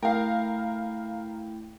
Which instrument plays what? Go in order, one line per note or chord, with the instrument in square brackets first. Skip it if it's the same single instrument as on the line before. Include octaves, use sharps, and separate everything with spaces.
[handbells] A3 E4 G5 [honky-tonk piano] A#4 F5